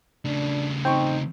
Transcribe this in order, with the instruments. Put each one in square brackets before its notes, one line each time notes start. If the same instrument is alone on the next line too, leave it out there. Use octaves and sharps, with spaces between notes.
[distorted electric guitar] C#3 A3 [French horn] D4
[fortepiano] C4 C#6 [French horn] D#4 [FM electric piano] G5